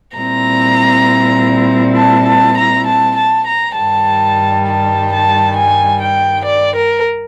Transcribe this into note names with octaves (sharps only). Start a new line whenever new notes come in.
A#2 G3 C4 E4 A#5
A5
A5
A#5
A5
A5
A#5
G2 D#3 G3 A5
A5
A5
G#5
G5
D5
A#4